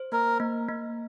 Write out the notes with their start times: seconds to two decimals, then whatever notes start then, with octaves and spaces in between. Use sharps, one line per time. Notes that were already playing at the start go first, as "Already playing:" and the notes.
Already playing: C5
0.12 A#3 A#4
0.40 A#3
0.69 A#3